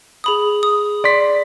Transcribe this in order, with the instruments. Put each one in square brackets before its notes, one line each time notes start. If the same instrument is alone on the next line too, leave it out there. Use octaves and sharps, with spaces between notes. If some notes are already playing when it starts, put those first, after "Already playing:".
[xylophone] G#4 B5 D#6
D#6
[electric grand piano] D5 C6 B6